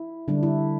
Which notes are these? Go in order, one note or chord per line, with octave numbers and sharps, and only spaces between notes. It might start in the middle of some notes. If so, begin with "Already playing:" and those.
Already playing: E4
D3 G3 D4
E4